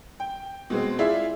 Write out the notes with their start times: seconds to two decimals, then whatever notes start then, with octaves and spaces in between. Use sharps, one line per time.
0.20 G5
0.70 B2 G#3 C4
0.99 E4 F4 G#4 D5 E5 F5